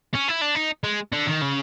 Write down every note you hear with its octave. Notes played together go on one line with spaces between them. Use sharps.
C#4
E4
D4
D#4
G#3
D3
D#3
C#3